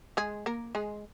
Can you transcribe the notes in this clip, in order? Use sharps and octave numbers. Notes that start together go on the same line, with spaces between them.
G#3 G#4
A#3 A#4
G#3 G#4